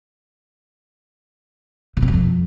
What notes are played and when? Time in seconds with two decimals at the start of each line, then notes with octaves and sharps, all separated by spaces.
1.97 C#3
2.02 C3
2.08 F#2
2.13 F2